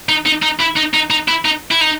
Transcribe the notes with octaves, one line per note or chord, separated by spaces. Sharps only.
D#4
D#4
D#4
E4
D#4
D#4
D#4
E4
D#4
E4
D#4